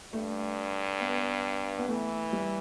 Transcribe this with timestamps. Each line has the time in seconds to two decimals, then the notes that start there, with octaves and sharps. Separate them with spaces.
0.13 G2 A3
1.00 B3
1.78 B3
1.89 E3 A3
2.33 G3